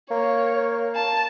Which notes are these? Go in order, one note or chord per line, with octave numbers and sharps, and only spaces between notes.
A#3 C#5
A5